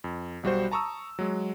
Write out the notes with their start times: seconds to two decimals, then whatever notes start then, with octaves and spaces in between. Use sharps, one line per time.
0.04 F2
0.43 B1 G3 F#4 C5
0.71 A5 A#5 C#6 D#6 E6
1.19 F#3 G#3